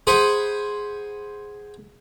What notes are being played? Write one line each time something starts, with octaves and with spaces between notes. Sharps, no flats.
G#4 C5 F#5 G#5 B5